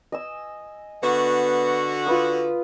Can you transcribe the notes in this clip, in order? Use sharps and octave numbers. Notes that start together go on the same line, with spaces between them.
D#5 G#5 E6
D3 B3 F#4
F4 B4 D#6